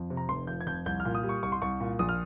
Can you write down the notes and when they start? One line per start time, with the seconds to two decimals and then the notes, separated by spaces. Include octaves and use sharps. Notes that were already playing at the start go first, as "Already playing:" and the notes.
Already playing: F2
0.10 C3
0.17 A#5
0.29 F1 C6
0.47 F3 G6
0.61 G#6
0.67 F2 G6
0.86 C2 G6
1.00 F6
1.05 A#2
1.15 D#6
1.23 G3
1.29 C#6
1.43 C2 C#6
1.52 C6
1.61 C2 C#6
1.81 A#2
1.99 A#1 D#6
2.09 F6